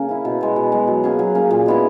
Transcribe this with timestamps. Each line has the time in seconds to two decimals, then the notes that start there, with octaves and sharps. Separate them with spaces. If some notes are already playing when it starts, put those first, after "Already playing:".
Already playing: C#3 A#3
0.09 C#4 E4
0.25 B2
0.41 G#3 B3
0.56 B2
0.72 G#3 B3
0.88 F#3
1.04 A#3 C#4 G#4
1.19 F#3
1.35 A#3 C#4 G#4
1.51 A#2
1.66 G#3 B3 E4